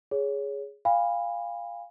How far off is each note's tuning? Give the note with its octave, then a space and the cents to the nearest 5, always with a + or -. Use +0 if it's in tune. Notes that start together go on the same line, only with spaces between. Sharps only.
G#4 +0 C#5 +15
F5 +0 G#5 -45 B5 +0